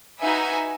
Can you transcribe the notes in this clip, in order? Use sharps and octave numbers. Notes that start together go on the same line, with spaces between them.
D#4 F#4 B4 E5 G#5